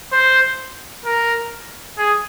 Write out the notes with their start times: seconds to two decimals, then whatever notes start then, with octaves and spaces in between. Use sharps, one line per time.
0.12 C5
1.05 A#4
1.98 G#4